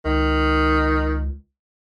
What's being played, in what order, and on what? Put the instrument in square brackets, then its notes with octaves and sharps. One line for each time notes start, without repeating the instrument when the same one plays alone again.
[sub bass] C#2 [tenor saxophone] D#3